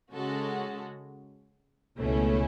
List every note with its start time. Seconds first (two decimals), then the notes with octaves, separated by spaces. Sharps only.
0.13 C#3 G#3 C#4 F#4 A4
1.98 C#2 B2 A3 C#4 E4